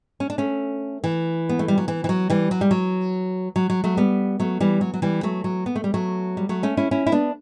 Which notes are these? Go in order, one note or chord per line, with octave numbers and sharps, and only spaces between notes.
C#4
D4
A3 C#4
E3
B3
A3
G3
F#3
E3
E3
F#3
E3 G3
F#3
G3
F#3
F#3
F#3
F#3 A3
G3 B3
F#3 A3
E3 G3
F#3
F#3
E3 G3
F#3 A3
F#3
B3
A3
G3
F#3 A3
G3
F#3 A3
A3 C#4
C#4 E4
C#4 E4
E4
B3 D4